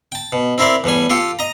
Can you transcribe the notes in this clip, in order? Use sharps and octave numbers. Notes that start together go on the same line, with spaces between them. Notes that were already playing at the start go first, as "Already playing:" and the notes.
G5 A5
B2
C4 E4 A#4 C5 D5
E2 A2 G3 G#5
F4 G4 A4 G5
D#5 A#5